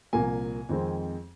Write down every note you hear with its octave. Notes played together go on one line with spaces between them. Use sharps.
C2 A#2 F3 A#3 G#5
F2 D#3 G#3 C4